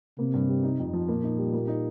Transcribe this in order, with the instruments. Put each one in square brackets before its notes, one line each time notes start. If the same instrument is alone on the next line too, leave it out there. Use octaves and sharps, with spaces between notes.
[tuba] C3 [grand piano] A#3
[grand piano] G2
G3
D#4
F2
F3
[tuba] A#2 [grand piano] A#3
[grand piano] D#4
G3
A#3
D#4